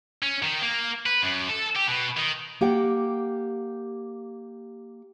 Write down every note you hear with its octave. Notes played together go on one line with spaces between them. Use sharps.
C#4
D#3
A#3
B4
F#2
A4
G4
B2
D#3
A#3 G4 F#5 G5